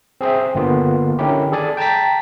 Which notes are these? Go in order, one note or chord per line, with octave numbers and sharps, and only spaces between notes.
C4 G#4 C5 E5
G1 D3 A#3 B3 F4
D3 D#3 C#4 D#4 E4 G4
G#4 A4 D5 G#5
G5 A5 A#5 A6 B6